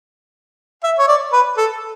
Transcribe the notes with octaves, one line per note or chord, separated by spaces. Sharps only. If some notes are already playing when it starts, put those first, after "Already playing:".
E5
C#5
D5
B4
A4